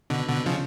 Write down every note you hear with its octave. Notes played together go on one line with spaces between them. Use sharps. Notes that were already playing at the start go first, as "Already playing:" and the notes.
B2 D3
B2 D3
C#3 F3